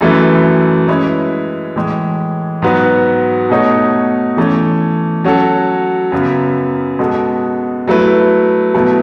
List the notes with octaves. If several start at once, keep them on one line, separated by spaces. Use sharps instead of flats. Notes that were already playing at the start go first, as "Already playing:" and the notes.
F#2 E3 A3 E4 B4
G#3 C#4 E4 B4
A2 E3 G#3
G#2 F#3 B3 F#4 B4
B2 A3 D#4 F#4 C#5
E3 A3 C#4
F#3 C#4 F#4 A4
F#2 C#3 F#3 B3
B2 G#3 B3 F#4 A4
F#3 A3 E4 B4
B2 F#3 A3 E4 B4